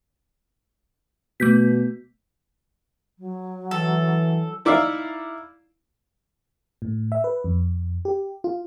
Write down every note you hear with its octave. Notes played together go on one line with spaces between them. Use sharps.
B2 A3 G6 B6
F#3
E3 A4
D#4 E4 D5 E5 F5
A2
E5
B4
F2
G4
F4